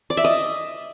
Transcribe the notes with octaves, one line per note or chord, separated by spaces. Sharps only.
D5
E5
D#5